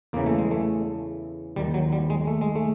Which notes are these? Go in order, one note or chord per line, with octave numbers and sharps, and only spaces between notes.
E2 C#3 E3 A#3
A3
G#3
A3
D#2 D#3 G3
F#3
G3
G#3
A3
G#3
A3